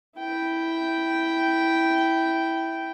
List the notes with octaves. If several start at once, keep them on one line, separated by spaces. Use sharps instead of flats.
E4 G5